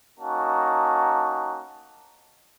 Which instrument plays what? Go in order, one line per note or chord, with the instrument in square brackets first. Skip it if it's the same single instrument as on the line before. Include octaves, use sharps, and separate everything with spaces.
[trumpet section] A#3 C#4 D#4 F#4 A5